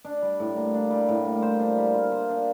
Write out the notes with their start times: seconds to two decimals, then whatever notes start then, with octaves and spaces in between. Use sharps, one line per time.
0.05 D4
0.22 G3
0.40 A2
0.56 A#3
0.74 D4
0.91 G3
1.09 A2
1.25 A#3
1.42 C5
1.60 D4
1.78 G3
1.94 F4
2.12 C5
2.29 D4